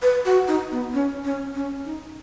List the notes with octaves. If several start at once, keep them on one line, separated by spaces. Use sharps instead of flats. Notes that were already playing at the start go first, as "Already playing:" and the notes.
B4
F#4
D#4
B3
C#4
C#4
C#4
D#4